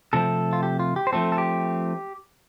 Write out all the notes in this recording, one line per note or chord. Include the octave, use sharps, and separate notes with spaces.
C3 F3 A3 C4 A4
F4
G4
F4
G4
C5
F3 A3 C4 A4
A4
G4